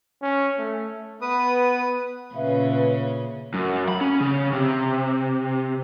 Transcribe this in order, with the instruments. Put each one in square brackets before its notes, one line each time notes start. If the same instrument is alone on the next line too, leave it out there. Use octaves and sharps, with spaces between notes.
[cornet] C#4
A3
[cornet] B3 [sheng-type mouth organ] B4 D#6
[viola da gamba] A#2 C#3 C#4 [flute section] B4 E5 F5
[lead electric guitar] F#2
B5
C#4
C#3
C3